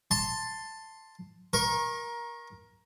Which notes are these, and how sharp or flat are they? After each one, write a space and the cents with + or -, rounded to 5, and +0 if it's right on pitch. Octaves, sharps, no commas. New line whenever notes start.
A5 +10 C6 +0
A#4 +20 C#6 -35